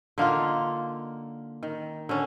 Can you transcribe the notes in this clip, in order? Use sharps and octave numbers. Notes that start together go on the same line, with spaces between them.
D3 A#3 D#4 F4
D#3
D3 C#4